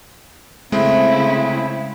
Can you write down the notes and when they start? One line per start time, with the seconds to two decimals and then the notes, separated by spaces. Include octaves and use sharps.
0.72 C#3 G#3 A3 C4 E4